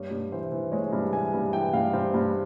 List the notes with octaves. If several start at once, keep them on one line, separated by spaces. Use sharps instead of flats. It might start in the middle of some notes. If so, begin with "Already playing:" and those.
Already playing: G2 C#5
G2
E3 C5
E3
G#3 C#5
G2
E3 G#5
G2
E3 G5
G2 F5
G2 C5
G2 C5